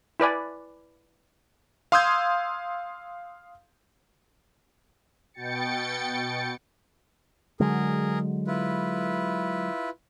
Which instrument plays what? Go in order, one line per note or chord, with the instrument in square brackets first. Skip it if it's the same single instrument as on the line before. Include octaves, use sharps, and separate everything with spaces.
[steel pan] E4 B4 D5 G#5
[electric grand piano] F5 C6 D#6 E6 G6 G#6
[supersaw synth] B2 G5 A6 C#7
[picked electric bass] D3 F#3 G#3 [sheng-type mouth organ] G#4 A#4
[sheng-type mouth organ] E4 F4 B4